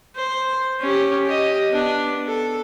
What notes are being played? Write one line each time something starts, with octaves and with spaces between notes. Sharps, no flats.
C5
C#4 G4
G4 D#5
B3 D4
A4